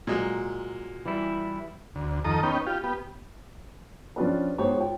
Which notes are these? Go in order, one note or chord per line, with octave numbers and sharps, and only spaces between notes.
A#2 F#3 G#3
E3 G3 E4
D2
F2 D#3 A4 A#5 D#6
B3 C#4 D#4 G5
F4 G4
B3 G4
F3 C#4 D4 F4 G4 B4
G#3 B3 D#4 G4 C5 C#5
F4 G5